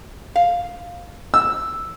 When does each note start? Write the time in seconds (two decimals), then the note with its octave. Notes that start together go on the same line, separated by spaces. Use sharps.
0.36 F5
1.34 E6